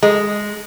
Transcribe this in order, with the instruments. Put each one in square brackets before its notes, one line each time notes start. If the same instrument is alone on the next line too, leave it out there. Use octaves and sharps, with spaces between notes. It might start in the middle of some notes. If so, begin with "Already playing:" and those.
[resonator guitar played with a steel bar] G#3